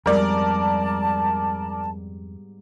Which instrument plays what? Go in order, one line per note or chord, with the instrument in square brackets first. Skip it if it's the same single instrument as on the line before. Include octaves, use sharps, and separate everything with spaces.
[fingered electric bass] F2 [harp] G#2 G3 B3 [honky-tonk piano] A#4 D5 [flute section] A5